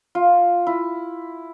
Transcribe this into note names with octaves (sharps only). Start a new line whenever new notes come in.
F4
E4